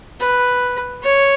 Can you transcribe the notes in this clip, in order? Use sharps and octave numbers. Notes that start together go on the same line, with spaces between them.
B4
C#5